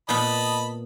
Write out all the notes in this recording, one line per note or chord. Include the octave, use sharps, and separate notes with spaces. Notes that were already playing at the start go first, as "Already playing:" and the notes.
A#2 B3 D#5 A5 B5